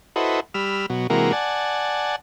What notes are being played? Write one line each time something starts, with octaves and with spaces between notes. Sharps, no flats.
E4 F#4 A4 B4 C5 D#5
G3 B5 E6 F6
B2 F#3
C3 E3 G#3 A#3 F#4 A#4
D5 F#5 G#5 A5